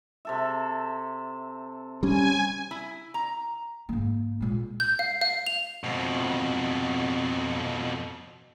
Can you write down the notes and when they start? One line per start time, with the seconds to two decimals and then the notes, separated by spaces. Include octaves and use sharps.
0.25 C3 A4 E5
2.03 G3 C#4 G#5
2.71 E4
3.14 A#5
3.89 G#2 A#3
4.41 A#2 G#3
4.80 G6
4.99 F5
5.22 F5
5.47 F7
5.84 F2 B2